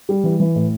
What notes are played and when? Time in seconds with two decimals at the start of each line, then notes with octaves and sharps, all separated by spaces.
0.09 G3
0.24 E3
0.40 E3
0.55 A2